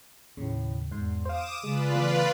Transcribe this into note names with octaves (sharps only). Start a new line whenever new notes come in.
D#2 A2 C#3
E2 G#2 C6
C5 F5 D6 D#6 E7
C#3 G#3 F4 B4 D5
E3 A3 B3